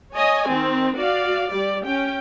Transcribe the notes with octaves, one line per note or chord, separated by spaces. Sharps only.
C#5 D#5 G#5
D#3 C4
F#4 D5 F5
G3 G4 D5
C#4 G5